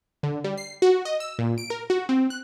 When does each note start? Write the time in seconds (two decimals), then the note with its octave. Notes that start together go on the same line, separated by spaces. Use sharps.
0.23 D3
0.44 G3
0.58 C7
0.82 F#4
1.05 D#5
1.20 E6
1.39 A#2
1.58 D7
1.70 A#4
1.90 F#4
2.09 C4
2.30 F#6